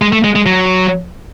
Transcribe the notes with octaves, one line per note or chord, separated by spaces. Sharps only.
G#3
A3
G#3
G#3
F#3